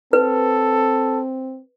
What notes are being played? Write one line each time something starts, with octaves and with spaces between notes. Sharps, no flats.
C4 A4 B4